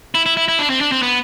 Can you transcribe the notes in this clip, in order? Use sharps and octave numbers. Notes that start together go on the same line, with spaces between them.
E4
E4
E4
E4
D4
C4
D4
C4
B3